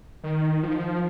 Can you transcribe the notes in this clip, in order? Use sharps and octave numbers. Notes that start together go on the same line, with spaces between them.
D#3
F3